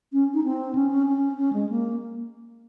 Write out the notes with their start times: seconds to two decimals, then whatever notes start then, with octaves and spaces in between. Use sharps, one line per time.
0.13 C#4
0.34 D#4
0.44 C4
0.75 C#4
0.91 C#4
1.07 C#4
1.37 C#4
1.53 G#3
1.69 A#3